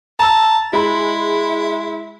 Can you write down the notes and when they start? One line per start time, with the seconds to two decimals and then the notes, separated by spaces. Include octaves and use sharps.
0.19 A5 A#5 E6
0.73 G#3 E4 B5